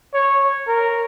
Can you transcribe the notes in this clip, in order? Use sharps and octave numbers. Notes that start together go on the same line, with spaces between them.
C#5
A#4